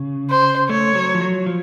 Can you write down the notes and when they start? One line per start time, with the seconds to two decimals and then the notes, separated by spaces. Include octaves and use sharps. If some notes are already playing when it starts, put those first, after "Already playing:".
Already playing: C#3
0.30 C5
0.69 A3 C#5
0.95 F#3
1.15 F3
1.21 F#3
1.46 F3